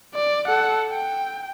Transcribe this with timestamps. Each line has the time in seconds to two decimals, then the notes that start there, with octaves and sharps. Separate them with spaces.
0.14 D5
0.47 A4 F#5
0.90 G5